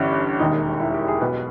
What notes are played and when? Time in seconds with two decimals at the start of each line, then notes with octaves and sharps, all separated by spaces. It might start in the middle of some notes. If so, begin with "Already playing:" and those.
Already playing: G1 G2 E3 C#4
0.39 E1 D#2 D#3 D#4
0.80 E4
0.94 G4
1.08 G#4
1.21 B1 B2 B4